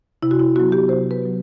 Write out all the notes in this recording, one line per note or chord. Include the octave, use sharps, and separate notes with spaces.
C3 E4
F#4
E4
F#3 B3 F#4
G4
C3 C5
B4
F#3 B3